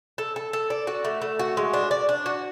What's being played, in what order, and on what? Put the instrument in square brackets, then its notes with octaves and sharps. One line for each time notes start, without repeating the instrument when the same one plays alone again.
[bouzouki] A4
A4
A4
D5
F#4
A3
A3
F#4
G#3
D4
D5
D4
F#4